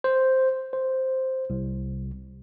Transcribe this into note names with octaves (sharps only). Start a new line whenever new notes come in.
C5
C5
C2